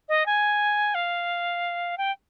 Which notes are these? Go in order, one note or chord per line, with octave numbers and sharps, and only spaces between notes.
D#5
G#5
F5
G5